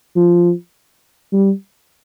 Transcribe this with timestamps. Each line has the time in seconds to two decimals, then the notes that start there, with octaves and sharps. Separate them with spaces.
0.16 F3
1.33 G3